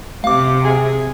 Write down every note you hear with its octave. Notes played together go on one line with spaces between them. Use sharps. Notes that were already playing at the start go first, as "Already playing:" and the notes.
C3 F5 D6
G#4